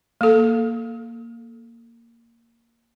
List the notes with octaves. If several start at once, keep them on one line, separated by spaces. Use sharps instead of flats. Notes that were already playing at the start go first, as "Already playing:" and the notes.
A#3 A4